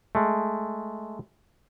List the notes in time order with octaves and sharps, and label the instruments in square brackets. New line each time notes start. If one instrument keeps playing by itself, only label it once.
[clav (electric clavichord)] G#3 A3